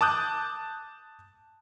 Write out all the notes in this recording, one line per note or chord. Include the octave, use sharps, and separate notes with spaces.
A5 D6 D#6 F#6 G6